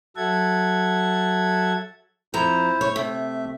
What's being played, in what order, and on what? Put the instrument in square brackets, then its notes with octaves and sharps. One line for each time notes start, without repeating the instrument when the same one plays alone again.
[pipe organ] F#3 A4 E5 F#5 A5 G#6
[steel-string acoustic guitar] F2 F3 A#5 [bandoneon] E4 C5
[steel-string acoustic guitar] C#5
[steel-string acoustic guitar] C3 [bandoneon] A3 E5